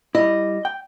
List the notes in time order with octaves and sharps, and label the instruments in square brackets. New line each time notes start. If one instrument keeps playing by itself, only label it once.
[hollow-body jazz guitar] G3 E4 [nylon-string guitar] D#5
[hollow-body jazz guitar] G5